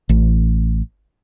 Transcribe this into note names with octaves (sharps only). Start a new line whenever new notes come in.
A1